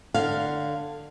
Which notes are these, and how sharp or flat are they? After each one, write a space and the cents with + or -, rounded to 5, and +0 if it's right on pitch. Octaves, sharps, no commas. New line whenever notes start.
D3 +15 C#5 +45 F5 +0